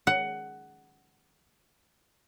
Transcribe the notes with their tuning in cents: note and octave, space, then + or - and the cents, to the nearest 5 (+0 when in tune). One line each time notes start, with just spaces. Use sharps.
F#5 +15